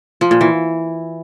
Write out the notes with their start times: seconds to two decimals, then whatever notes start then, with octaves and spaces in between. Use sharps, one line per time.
0.21 F3
0.31 A#2
0.41 E3